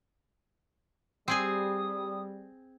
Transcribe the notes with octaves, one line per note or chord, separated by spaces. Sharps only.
G3 C4 G#4 G#5 D#6